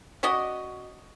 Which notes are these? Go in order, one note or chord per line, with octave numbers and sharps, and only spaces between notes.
C#4 F#4 D5 D#5